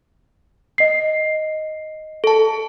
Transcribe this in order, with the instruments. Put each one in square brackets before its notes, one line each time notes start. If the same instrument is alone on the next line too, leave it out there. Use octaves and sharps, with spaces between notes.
[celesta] D#5 C7
[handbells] A4 A5